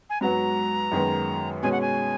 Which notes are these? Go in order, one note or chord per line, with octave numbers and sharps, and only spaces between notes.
G#5
G#2 F#3 B3 F#4 A#5
F#2 D#3 G#3 B3
B2 G#3 C#4 G#4 G#5
F#5
G#5